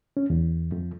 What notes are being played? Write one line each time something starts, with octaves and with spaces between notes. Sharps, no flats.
C#4
E2
F2